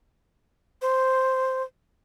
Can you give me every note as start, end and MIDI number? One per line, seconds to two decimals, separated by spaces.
0.82 1.63 72